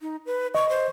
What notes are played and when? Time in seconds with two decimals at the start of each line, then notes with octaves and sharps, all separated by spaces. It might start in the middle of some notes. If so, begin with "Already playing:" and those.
0.01 D#4
0.26 B4
0.55 D#5 C#6
0.69 C5